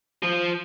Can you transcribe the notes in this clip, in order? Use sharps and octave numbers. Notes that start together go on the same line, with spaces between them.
F3